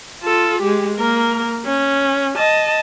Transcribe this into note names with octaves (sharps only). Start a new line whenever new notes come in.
F4 A4
G#3 G4
A#3 A#4
C#4
D#5 A5